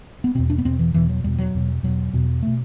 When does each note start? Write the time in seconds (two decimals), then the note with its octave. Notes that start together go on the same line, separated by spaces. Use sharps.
0.24 B3
0.35 E2 B2 C4
0.50 D4
0.58 B3
0.65 E2 B2 C4
0.79 E3
0.94 E2 B2 E3
1.09 F#3
1.24 E2 B2 G3
1.39 F#3
1.54 E2 B2
1.83 E2 B2 F#3
2.13 E2 B2
2.43 B2 A3